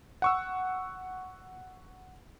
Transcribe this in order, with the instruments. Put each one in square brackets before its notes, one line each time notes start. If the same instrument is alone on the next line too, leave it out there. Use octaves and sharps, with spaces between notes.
[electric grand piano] F#5 C#6 E6